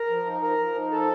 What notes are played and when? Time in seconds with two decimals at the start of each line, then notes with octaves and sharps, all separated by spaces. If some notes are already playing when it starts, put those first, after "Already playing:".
Already playing: A#4 A#5
0.09 F3
0.25 D#4
0.42 F3 A#4 A#5
0.58 F3
0.75 D#4
0.91 F3 A4 A5